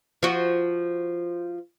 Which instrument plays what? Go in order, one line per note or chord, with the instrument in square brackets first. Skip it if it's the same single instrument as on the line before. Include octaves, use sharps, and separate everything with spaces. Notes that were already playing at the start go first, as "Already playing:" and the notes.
[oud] F3 F#4